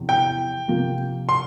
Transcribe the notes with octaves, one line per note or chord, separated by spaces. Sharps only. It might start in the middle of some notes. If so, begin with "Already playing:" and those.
Already playing: E2 C3 F3
G5
C3 F3 A#3 F4
C6